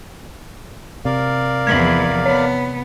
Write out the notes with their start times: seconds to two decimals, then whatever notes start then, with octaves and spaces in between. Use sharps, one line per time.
1.05 C3 A#4 D5 F5
1.67 E2 F3 G#6 B6 F#7
2.26 B3 C#5